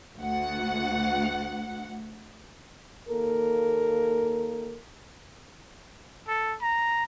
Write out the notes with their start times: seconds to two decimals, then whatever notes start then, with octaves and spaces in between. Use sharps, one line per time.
0.18 D2 F#5
3.09 D#2 A#3 A4 A#4
6.28 A4
6.62 A#5